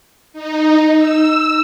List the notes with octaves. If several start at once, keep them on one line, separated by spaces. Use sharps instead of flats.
D#4
E6